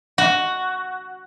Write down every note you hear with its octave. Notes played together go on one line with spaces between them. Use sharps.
F#4